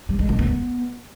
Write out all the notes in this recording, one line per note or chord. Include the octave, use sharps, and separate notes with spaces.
G3
G#3
D#3
B3